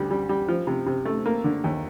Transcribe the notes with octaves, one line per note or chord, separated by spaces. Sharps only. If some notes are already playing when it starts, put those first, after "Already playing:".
Already playing: D2 G3
G3
G3
F3
C3
C3
A3
A#3
D3
D#2